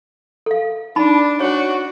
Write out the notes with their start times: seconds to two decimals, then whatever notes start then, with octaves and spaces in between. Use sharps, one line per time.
0.46 A4 F5
0.96 D4 D#4 A5 B5
1.40 D4 F#4 C#5 G#5